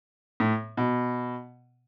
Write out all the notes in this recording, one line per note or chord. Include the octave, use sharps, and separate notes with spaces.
A2
B2